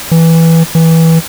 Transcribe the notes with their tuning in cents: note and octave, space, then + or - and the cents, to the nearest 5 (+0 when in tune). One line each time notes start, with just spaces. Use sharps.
E3 -5
E3 -15